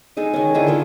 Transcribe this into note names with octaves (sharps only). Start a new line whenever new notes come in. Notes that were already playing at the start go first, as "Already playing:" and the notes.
G#3 D#4 G#4 A4
D#3 C#4
D3 D#3 E4 G#4
D#3 F4 A4 C6